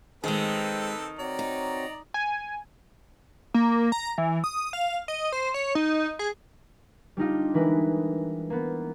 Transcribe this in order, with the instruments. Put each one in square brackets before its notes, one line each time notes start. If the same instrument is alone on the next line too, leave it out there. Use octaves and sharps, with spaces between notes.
[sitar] D#3 [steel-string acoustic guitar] G#3 G#4 [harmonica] C4 A4 B4 [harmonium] C5 G5
[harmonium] C4 F#4 C#5 [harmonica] D5 A#5
[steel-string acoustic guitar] D#4
[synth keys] G#5
[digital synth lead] A#3
A#5
E3
D#6
F5
D#5
C5
C#5
D#4
G#4
[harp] G3 D4 D#4 F4
E3 G#3 E4 A#4 B4
A#3 B3